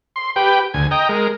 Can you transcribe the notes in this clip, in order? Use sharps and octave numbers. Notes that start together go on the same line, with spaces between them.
C6
G4 B4 G5
D2 G#5
D#5 G5 A#5
G#3 A#4